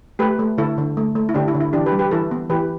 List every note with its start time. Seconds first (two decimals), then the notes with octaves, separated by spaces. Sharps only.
0.19 A3 G4 B4
0.39 A3
0.58 D3 E4 A4
0.78 D3
0.97 A3
1.15 A3
1.29 E4
1.34 D3 D4 G4
1.48 E4
1.54 D3
1.60 E4
1.73 E3 D4 G4
1.86 G4 B4
1.92 G3
1.99 G4 B4
2.11 E3 E4 A4
2.31 B3
2.50 E3 G4 B4